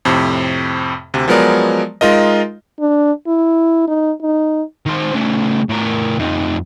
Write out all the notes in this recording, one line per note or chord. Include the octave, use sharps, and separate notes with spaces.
F2 A2 C3
D2 C3
F3 F#3 G#3 B3 A#4 D5
G#3 D#4 F4 A#4 D#5
D4
E4
D#4
D#4
D#3 C5
C#3 A3
A2 A#4
F2 D#4